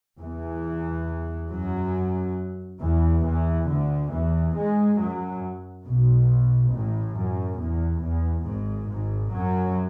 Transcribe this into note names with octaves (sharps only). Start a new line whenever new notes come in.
E2 E3
F#2 F#3
E2 E3
E2 E3
D2 D3
E2 E3
G#2 G#3
F#2 F#3
B1 B2
A1 A2
F#2
E2
E2
G#1 G#2
G#1 G#2
F#2 F#3